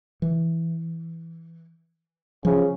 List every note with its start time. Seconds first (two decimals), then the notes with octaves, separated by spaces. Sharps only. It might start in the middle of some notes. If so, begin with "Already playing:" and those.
0.22 E3
2.45 C#3 F3